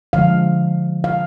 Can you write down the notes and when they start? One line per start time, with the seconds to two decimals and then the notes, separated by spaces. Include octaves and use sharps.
0.13 D3 F3 G#3 F5
1.04 F5